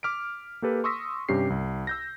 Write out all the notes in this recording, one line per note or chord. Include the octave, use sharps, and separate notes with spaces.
D6 F6 B6 D7
A#3 G4 A4 B4
C6 C#6 D#6 E6 A#6 B6
G2 C3 C#4 G4 C7
C2
E6 G6 A#6